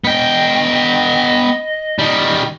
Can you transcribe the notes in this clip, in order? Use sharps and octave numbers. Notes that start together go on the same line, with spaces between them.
B3 D#5 G5
D#3 G3